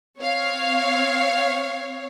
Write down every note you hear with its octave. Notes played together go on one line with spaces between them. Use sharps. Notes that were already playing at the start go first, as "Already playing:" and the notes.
C4 C#5 F5